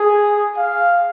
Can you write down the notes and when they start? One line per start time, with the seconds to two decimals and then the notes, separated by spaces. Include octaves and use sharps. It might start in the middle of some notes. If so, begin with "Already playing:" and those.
Already playing: G#4
0.57 F5